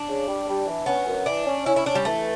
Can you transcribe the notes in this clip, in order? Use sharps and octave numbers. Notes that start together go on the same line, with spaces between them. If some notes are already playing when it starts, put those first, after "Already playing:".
Already playing: D4
C#3
G3
G3
E3
B3 C#4
F#2
E3 D4
C#4
C#4 E4
E4
C#4 D4
G3
E3 A3